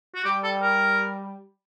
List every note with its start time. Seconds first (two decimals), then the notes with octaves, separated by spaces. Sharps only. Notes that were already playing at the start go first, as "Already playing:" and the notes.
0.15 F#4
0.25 G3 G4
0.44 A4
0.62 A#4